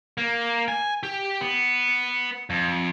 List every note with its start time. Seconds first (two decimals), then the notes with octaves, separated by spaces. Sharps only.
0.18 A#3
0.68 G#5
1.03 G4
1.41 B3
2.50 F2